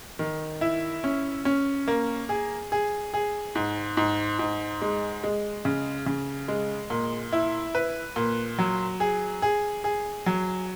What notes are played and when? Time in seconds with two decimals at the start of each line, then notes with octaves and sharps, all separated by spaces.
0.19 D#3
0.61 E4
1.04 C#4
1.45 C#4
1.88 A#3
2.29 G#4
2.72 G#4
3.14 G#4
3.55 G#2
3.97 G#2
4.39 G#2
4.82 G#3
5.24 G#3
5.65 C#3
6.06 C#3
6.48 G#3
6.90 A#2
7.33 E4
7.75 B4
8.16 A#2
8.58 F#3
9.00 G#4
9.42 G#4
9.84 G#4
10.26 F#3